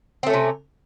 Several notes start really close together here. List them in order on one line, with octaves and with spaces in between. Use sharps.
C4 A3 C#4 C3